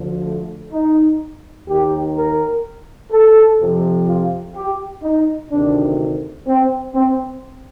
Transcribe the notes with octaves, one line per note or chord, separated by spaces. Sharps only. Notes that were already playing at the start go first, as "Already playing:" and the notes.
Already playing: D2 D3 F3
A3
D#4
D#2 D#3 G4
A#4
A4
F2 C3 F3
F4
G4
D#4
D2 C3 D#3 D4
C4
C4